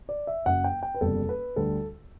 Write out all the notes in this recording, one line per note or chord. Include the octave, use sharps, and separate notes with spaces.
D5
E5
F#1 F#2 F#3 F#5
G5
G5
B4
F#1 E2 C3 G3 A4
B4
D2 D3 G3 A4